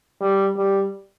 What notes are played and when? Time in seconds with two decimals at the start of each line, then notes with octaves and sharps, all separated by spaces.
0.21 G3
0.57 G3